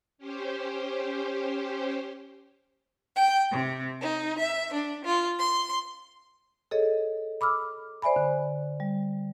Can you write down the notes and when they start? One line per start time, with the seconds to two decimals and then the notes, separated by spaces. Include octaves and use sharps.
0.18 C#4 G4 C5
3.15 G5
3.51 C3
4.01 D#4
4.38 E5
4.72 D4
5.04 F4
5.38 C6
6.71 G#4 A4 C#5 D#5
7.41 B5 D6 E6 F6
8.02 C5 D5 E5 G#5 B5
8.16 D3
8.80 G3